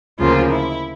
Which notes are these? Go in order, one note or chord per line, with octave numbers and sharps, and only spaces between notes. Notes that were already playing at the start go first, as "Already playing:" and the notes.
D2 C#3 F3 A#3 F4
E4